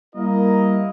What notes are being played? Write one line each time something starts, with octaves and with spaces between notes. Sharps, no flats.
G3 A#3 E4 A#4 D#5